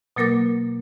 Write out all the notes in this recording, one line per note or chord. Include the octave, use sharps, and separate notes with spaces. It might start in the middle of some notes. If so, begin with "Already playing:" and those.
B2 F#3 A#3 A#4 D6 A6